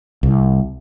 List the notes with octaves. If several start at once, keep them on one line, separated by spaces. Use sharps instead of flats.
C2